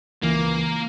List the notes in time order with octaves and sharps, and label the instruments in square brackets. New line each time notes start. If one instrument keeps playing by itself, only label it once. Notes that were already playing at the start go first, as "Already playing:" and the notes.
[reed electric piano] C#2 E3 [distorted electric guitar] A#3